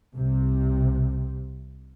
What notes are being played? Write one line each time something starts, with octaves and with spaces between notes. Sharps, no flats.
C2 C3